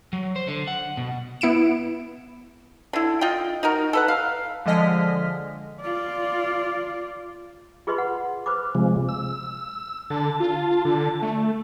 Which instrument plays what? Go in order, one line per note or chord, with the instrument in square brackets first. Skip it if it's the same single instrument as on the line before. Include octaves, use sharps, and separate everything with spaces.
[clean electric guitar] F#3
C5
D3
F#5
B2
[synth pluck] B3 E4 C#7 D7 E7
[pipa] D3 E4
F4 D#5 G5
D#4 F#4 A#4
A4 B4 F#5
F5
[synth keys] D3 F3 G#3 D#5 F6 B6
[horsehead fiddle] F4 D5
[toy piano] F4 G#4 B4 D#5 B5 C6
F#5
B4 C5 B5 D6
[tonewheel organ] C3 F3 G#3
E6
[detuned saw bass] D3 [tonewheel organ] A5
[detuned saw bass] F4
D3
A3